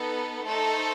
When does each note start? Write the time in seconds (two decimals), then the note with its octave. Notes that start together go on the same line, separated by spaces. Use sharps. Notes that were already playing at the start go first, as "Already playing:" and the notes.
Already playing: B3 D#4 A4 B4
0.46 A3 D#4 A4 C5